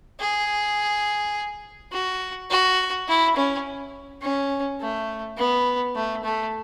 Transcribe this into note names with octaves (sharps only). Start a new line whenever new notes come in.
G#4
F#4
F#4
E4
C#4
C#4
A3
B3
A3
A3